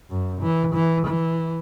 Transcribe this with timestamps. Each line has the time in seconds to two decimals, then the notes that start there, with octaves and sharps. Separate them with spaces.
0.09 F#2
0.41 E3
0.75 E3
1.06 E3